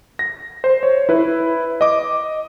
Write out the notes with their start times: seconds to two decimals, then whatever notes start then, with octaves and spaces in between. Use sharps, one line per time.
0.19 A#6
0.64 C5
0.83 C#5
1.09 E4 B4
1.81 D#5 D6